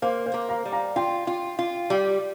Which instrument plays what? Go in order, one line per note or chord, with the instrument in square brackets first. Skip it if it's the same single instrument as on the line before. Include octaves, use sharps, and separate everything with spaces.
[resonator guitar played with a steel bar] A#3 [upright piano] C5 F5
[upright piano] C5 F5
[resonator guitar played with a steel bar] A#3
[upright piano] F5 A#5
[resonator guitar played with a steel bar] G3
[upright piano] F5 A#5
[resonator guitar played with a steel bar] F4 [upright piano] G5 C6
[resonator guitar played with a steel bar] F4
F4
G3